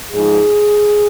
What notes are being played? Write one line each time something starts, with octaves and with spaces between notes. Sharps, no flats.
G#2 F3 G#4